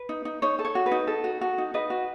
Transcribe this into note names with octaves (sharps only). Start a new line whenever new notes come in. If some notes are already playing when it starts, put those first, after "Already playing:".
Already playing: B4
D#4
D#4
D#4 C#5
A4
C#5
F#4
B4
D#4
A4
F#4
F#4
D#4
D#4 B4 D#5
F#4